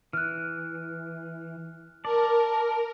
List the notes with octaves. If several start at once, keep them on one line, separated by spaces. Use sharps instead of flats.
E3 F6 F#6
A#4 D5 A5